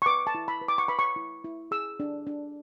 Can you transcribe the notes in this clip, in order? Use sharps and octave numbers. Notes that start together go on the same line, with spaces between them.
C#6
B4 D6
A5
E4
B5
B4
D6
C#6
B4 B5
C#6
E4
E4
G#4 E6
D4
D4